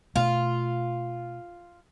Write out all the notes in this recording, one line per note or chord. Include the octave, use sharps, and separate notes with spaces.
B2 A3 F4